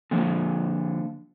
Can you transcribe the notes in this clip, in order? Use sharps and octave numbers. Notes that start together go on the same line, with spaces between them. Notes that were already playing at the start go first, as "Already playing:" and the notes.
D3 F3 A#3 C4